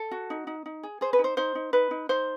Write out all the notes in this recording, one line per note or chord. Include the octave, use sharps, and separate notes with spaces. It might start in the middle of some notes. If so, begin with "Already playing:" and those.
Already playing: A4
F#4
D#4
D#4
D#4
G#4
G#4 C5
B4
D#4
C5
D#4 C5
D#4
D#4 B4
D#4
D#4 C5